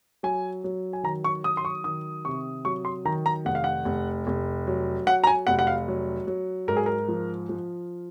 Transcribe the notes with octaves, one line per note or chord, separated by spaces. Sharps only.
F#3 G#5
F#3
G#5
D#3 A#5
C#6
F#3 D#6
C6
C#6
D#3 D#6
C3 C#6
F#3 C#6
C6
D#3 A#5
A#5
F1 F#5
F5
F#5
F1
F1
F#3
F#3 F#5
A#5
G#5
F1 F#5
F#5
F5
F#3
F#3
G#2 A#4
G#4
A#4
F3
F3